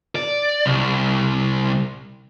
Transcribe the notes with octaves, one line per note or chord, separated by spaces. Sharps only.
D5
C2